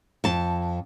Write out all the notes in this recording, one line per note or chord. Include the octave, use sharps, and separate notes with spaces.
F2 A5